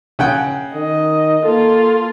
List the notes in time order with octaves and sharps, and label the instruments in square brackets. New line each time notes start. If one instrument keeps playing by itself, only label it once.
[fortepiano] C#3 F#5 G5
[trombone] D#3 [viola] D#5
[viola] A#3 F4 [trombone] A4